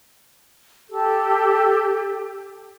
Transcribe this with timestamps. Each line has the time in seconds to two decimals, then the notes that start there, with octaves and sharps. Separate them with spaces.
0.90 G4 A4